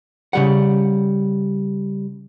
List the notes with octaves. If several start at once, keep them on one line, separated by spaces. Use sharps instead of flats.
C#3 G3 F#5